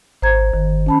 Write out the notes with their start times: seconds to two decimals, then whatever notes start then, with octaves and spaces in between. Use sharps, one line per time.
0.22 G#1 C5 A#5 G#6
0.54 G1 D#3
0.86 C#4 A5 B5